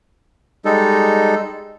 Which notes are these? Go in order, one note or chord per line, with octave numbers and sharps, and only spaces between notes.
G3 G#3 D#4 A4